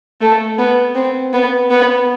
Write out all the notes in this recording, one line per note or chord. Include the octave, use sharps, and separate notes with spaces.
A3
B3
C4
B3
B3